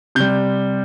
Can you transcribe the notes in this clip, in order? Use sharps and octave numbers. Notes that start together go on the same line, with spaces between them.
C3 G3 G6